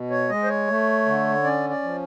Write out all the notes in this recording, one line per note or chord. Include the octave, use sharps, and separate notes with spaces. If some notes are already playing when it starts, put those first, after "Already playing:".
Already playing: B2
C#5
G#3 D#5
C5
C#5
A3
D3
C#4 D5
D5
F3